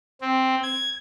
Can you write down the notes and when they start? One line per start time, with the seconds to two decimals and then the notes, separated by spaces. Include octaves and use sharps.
0.21 C4
0.63 G#6